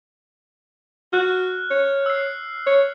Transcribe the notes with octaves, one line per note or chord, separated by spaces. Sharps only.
F#4 F6 F#6
C#5
E6 C7
C#5